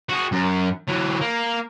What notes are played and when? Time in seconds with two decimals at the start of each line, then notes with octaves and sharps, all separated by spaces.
0.09 F#4 G#4
0.32 F#2
0.89 E3 F#3
1.21 A#3